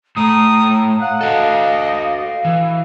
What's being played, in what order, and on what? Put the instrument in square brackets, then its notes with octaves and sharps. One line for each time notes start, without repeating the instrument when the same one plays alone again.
[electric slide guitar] A2 A3 [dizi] A#5 [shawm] D#6
[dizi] F5 [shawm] F#5
[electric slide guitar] F#4 A4 [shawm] D#5 [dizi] F5
[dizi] F5
[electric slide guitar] E3